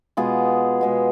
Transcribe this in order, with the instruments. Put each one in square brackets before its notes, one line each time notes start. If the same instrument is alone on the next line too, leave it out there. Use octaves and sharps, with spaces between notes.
[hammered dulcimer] B2 G#3 B3 F4 G#4
B2 G#3 B3